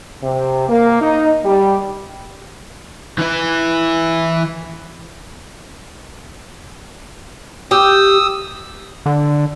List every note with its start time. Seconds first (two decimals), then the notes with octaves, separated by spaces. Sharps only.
0.23 C3
0.69 A#3
1.02 D#4
1.45 G3
3.18 E3 E4
7.71 G4 D#6 E6
9.06 D3